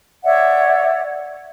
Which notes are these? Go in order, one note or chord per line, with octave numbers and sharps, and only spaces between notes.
C#5 D5 E5 F#5